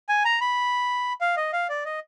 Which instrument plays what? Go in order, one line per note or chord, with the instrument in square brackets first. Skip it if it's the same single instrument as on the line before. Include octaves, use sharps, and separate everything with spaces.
[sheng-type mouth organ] G#5
A#5
B5
F5
D#5
F5
D5
D#5